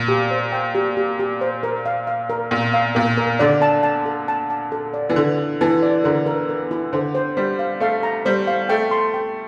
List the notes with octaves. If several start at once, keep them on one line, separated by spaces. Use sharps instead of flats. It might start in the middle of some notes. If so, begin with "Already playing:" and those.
Already playing: A#2
G4
C5
G5
G4
G4
G4
C5
A#4
F5
F5
A#4
A#2 A#4
F5
A#2 A#4
A#4
D3 D5
A5
A5
A4
A5
A5
A4
D5
E3
D3 E4
E4
E3 A5
D5
D3 A#4
A#4
A#4
E4
D3 C5
C5
G3 C5
F5
A3 F5
A#5
G3 C5
F5
A3 G5
C6
G5